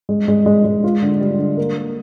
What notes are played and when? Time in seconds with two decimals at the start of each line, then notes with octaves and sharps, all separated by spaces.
0.09 G#3
0.28 G#3
0.46 G#3
0.65 G#3
0.84 F4
1.02 D3
1.21 G3
1.39 D3
1.57 A#3
1.77 A#3